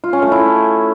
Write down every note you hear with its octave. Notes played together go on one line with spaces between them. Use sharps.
F4
C#4
A3
E4